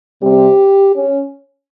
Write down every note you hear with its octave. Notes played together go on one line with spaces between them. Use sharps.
C3 G3 C4 G4
C#4